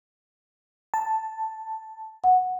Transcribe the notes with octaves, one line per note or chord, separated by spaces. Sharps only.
A5
F#5